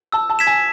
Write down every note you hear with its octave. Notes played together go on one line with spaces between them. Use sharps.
A5 E6
A5
G#6 B6 E7
G#5